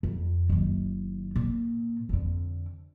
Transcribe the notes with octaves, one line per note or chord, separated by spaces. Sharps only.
F2
F#1 D#3
A#2
F2 D3